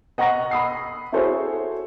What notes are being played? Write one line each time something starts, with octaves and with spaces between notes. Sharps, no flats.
D#5 F#5 A#5 C#6 A#6
B5 D#6 C7
E4 F#4 G#4 A4 C5 C#5